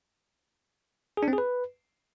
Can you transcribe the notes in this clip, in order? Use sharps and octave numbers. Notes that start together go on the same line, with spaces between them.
G#4
D4
C4
G#4
B4